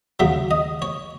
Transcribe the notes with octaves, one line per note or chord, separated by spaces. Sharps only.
D#2 C#3 F#3 E5
D#5
C#5